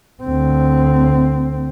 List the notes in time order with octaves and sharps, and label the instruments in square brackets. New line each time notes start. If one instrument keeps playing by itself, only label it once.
[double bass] D2 C4